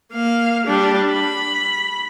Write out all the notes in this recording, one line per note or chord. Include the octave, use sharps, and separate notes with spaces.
A#3 F5
G3 D4
B5